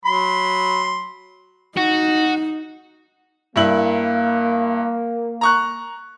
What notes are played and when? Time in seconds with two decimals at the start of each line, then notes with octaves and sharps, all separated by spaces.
0.05 F#3 B5 C6
1.77 D#4 F#4
3.56 G2 A#3 E4 F#7
5.41 A#5 C#6 F#6